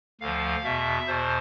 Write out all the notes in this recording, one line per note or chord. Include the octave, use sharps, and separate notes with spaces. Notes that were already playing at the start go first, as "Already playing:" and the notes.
D2 D3 F3 F5
E2 B2 E5
E2 B2 C5